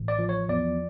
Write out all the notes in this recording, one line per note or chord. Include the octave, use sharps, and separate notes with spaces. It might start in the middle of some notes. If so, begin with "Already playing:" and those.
Already playing: A1
D5
F3
C#5
E2 D5